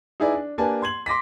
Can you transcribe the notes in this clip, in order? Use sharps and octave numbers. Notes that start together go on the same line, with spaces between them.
D#4 E4 G#4 B4 D5
D4
A#3 D4 G4 B4 G#5 A5
C6 G#6 F#7
C6 D6 A#6 B6